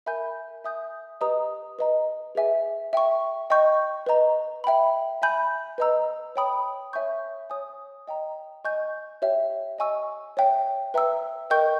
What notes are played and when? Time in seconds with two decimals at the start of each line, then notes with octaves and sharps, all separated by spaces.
0.06 A#4 E5 G#5 B5 G6
0.64 E5 G#5 D#6 G6
1.21 G4 B4 D#5 A#5 D#6
1.79 B4 D#5 A#5
2.35 G#4 B4 E5 G#5
2.93 E5 G5 C#6
3.50 D#5 G5 C#6 G6
4.06 B4 D#5 A#5
4.64 E5 G5 B5
5.22 E5 G#5 B5 G6
5.78 B4 D#5 A#5 E6
6.36 C#5 G5 B5 D#6
6.93 C#5 E5 G#5 C#6 G6
7.50 C#5 G#5 D#6
8.08 D#5 G5 A#5
8.65 D#5 G#5 C#6 G6
9.22 G4 C#5 E5 G5
9.78 D#5 G#5 C#6 E6
10.37 C#5 E5 G5
10.94 B4 E5 G5 A#5 E6
11.50 A#4 D#5 G5 C#6 G6